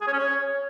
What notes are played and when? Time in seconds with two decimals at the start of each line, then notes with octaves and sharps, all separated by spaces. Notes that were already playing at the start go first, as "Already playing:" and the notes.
0.01 G#4
0.07 C#5
0.13 C#4
0.19 C#5